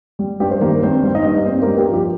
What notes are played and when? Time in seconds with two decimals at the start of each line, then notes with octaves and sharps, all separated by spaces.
0.19 G3
0.40 G2 G4
0.51 C5
0.61 D#3 A#3 A#4
0.83 G2 C4 C5
1.03 G3
1.14 D#4 D#5
1.25 G2
1.46 A#3 C4 C5
1.62 A#3 A#4
1.67 G2
1.78 G4
1.89 F3 G4